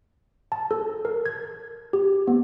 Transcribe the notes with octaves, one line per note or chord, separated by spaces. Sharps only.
A5
A4
A#4
G#6
G4
B3